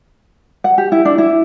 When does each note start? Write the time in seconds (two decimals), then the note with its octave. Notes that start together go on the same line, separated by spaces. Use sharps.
0.64 F#5
0.78 G4
0.92 E4
1.05 D4
1.18 E4